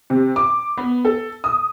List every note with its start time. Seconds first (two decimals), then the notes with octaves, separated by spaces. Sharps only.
0.10 C3
0.36 D6
0.78 B3
1.05 A4
1.44 D#6